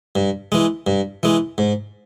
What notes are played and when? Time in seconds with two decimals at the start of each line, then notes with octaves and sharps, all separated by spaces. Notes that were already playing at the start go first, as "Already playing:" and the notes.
0.16 G2
0.52 E3 G#3
0.87 G2
1.23 E3 G#3
1.58 G#2